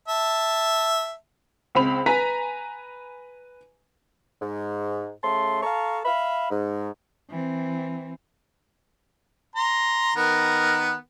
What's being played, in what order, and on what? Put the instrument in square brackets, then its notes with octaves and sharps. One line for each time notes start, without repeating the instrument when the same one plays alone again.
[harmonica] E5 A5
[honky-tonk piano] C#2 C4 B5 F7
B4 G#5 A#5 B6
[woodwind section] G#2
C#3 A3 A5 C6
A4 F5 A5 A#5 C#6
E5 F5 B5
G#2
[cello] E3 C4
[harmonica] A#5 C6
D#3 B3 A#4